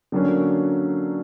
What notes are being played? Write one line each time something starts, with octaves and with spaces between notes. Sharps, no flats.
D3 F#3 A#3 C#4 F#4